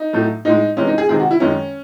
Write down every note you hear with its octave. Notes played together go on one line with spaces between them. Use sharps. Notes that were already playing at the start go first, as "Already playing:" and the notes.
Already playing: D#4
A2 F#3 A3
A2 G#3 D#4
C3 E3 G#3 C#4
D#4
G#4
C3 D#3 G#3 G#4
F#4
E4
F#2 D#3 G#3 C#4